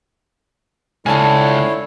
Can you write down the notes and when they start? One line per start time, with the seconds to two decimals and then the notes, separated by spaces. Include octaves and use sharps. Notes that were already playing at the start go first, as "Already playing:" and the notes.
1.06 C#2 D3 E4 C#5 G#5 A5